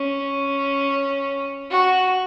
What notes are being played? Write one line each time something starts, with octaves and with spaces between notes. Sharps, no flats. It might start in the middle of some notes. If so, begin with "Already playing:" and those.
Already playing: C#4
F#4